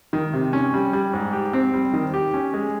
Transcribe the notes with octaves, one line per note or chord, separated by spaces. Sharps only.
D#3
C3
C#4
G3
G3
G#2
G4
C4
G3
D#3
G4
C#4
G#3